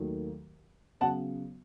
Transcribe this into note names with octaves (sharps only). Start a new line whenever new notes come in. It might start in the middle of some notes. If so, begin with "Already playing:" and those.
Already playing: D#2 D#3 F#3 A3
C#3 F#3 B3 F#5 A5